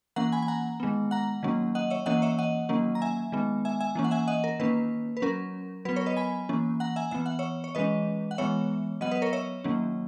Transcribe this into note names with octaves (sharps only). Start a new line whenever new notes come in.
E3 A#3 C#4 F#5 A#5
G#5 B5
G#5
F#5 A#5
D#3 G#3 B3
F#5 A#5
D#3 F#3 A#3 C#4
D#5 F#5
C#5 E5
E3 A#3 C#4 D#5 F#5
C#5 E5
D#5 F#5
D#3 F#3 A#3 C#4
A#5
E5 G#5
D#3 G#3 B3
E5 G#5
E5 G#5
E3 A#3 C#4
F#5
E5 G#5
D#5 F#5
A#4
D#3 A#3 C#4 B4
B4
F#3 C#4 A#4
F#3 B3 B4
A#4 C#5
B4 D#5
G#5 B5
E3 A#3 C#4
F#5 A#5
E5 G#5
E3 B3 E5
F#5
C#5 E5
C#5
E3 G#3 C#4 B4 D#5
F#5
E3 G#3 B3 C#5 E5
F#3 B3 D#5 F#5
B4 D#5
A#4 C#5
C#5 E5
D#3 F#3 A#3 C#4